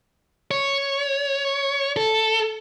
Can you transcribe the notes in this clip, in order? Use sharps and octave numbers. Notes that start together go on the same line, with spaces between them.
C#5
A4